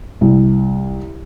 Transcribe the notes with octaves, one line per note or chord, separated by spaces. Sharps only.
C2